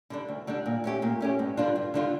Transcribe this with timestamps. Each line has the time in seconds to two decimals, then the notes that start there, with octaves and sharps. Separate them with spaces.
0.10 D3 G3 D4
0.28 D2
0.47 D3 G3 D4
0.66 A#2
0.84 A3 C#4 G4
1.02 A#2
1.21 A3 C#4 G4
1.39 G2
1.57 D3 G3 D4 F4
1.76 G2
1.94 D3 G3 D4 F4